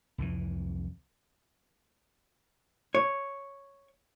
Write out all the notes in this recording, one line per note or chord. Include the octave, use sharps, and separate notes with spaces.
C2 F2 E3
C#5